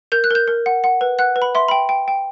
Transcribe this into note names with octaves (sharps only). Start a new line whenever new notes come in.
A#4 G6
F#6
A#4 G6
A#4
F#5
F#5
B4
F#5 F#6
B4
B5
E5 C6
G5 B5
G5
G5